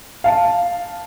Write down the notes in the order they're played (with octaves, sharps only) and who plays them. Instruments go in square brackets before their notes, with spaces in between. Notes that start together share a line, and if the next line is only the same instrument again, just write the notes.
[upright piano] F5 A5